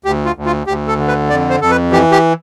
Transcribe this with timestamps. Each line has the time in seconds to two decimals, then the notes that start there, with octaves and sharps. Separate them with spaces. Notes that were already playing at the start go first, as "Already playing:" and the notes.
0.05 D2 G4
0.26 F4
0.36 D2
0.46 F4
0.67 D2 G4
0.88 A4
0.98 D3
1.08 B4
1.29 F2 D5
1.50 C5
1.60 F2 A4
1.71 B4
1.91 E3 G4
2.12 G4